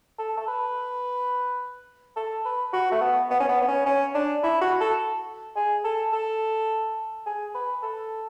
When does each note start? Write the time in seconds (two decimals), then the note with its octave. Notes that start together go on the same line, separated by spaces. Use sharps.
0.19 A4
0.37 A4
0.48 B4
2.17 A4
2.45 B4
2.73 F#4
2.92 A3
3.01 B3
3.30 B3
3.40 C#4
3.49 B3
3.61 B3
3.68 C#4
3.86 C#4
4.15 D4
4.44 E4
4.61 F#4
4.80 A4
5.56 G#4
5.84 A4
6.13 A4
7.26 G#4
7.54 B4
7.83 A4